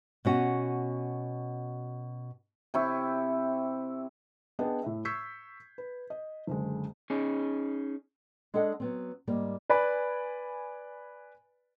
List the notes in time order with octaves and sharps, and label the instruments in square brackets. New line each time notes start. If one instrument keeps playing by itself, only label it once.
[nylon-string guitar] B2 C#4 F#4
[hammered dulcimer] C3 E4 C#6
[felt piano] B3 D4 G#4 D#5 G5
A2 E5
C#6 E6 G6 G#6 B6 C7
B4
D#5
F#1 D3 G#3
[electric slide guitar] C#4 D#4 G#4
[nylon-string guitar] G#3 D4 G#4 A4 D#5 F#5
F#3 B3 C4
G#2 G3 A#3
[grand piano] B4 D5 G#5 B5